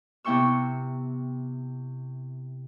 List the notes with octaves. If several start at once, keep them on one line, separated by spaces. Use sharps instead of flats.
C3 B3 E4 G5 C#6 E6